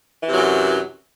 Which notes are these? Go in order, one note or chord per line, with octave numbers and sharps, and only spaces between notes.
F#2 C3 E3 F#3